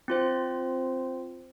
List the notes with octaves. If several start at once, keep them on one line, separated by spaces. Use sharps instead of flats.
C4 F4 C5